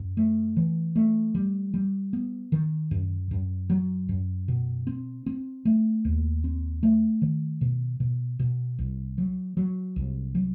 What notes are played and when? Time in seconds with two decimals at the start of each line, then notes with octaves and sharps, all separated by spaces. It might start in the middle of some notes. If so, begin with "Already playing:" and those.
Already playing: F#2
0.17 A3
0.57 E3
0.96 A3
1.35 G3
1.74 G3
2.13 B3
2.52 D#3
2.91 F#2
3.31 F#2
3.70 F#3
4.09 F#2
4.48 B2
4.87 C4
5.26 C4
5.65 A3
6.05 D#2
6.44 C4
6.83 A3
7.22 D#3
7.61 B2
8.00 B2
8.39 B2
8.79 C2
9.18 F#3
9.57 F#3
9.96 C2
10.35 F#3